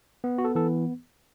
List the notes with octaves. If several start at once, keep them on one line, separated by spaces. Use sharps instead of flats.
B3
F#4
A4
E3 A4